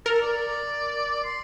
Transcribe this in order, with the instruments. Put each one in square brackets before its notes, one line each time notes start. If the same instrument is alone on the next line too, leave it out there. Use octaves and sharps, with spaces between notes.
[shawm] A4 [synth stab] A#4
[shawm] D5
C6